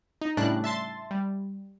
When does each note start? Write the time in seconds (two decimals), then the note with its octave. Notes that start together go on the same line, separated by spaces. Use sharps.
0.21 D#4
0.37 A2 C#3 G3 D4 A5 F#6
0.64 E5 A5 C6 A6
1.11 G3